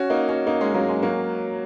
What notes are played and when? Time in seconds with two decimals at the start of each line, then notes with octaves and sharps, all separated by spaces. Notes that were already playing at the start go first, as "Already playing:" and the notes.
Already playing: C#4 F#4
0.10 A#3 D#4
0.29 C#4 F#4
0.47 A#3 D#4
0.60 G#3 C#4
0.74 F#3 A#3
0.89 G#3
1.03 F#3 A#3